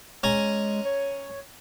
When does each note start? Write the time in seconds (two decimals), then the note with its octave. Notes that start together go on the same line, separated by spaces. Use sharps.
0.23 G#3 C#4 G#5 A#5
0.85 C#5